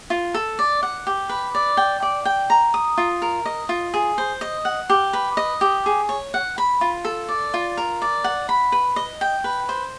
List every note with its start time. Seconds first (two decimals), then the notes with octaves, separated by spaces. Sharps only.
0.10 F4
0.34 A4
0.59 D5
0.83 F#5
1.07 G4
1.29 B4
1.55 D5
1.77 G5
2.02 D5
2.25 G5
2.50 A#5
2.74 D#6
2.98 F4
3.22 A#4
3.45 D#5
3.69 F4
3.94 G#4
4.18 C5
4.41 D#5
4.65 F#5
4.90 G4
5.13 B4
5.37 D#5
5.61 G4
5.86 G#4
6.09 C#5
6.34 F#5
6.58 B5
6.81 F4
7.05 A4
7.29 D5
7.54 F4
7.77 A#4
8.02 D5
8.24 F#5
8.49 B5
8.72 B4
8.96 D#5
9.21 G5
9.44 B4
9.69 C5